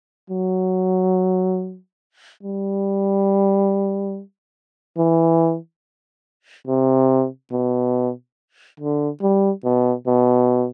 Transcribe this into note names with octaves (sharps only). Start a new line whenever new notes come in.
F#3
G3
E3
C3
B2
D3
G3
B2
B2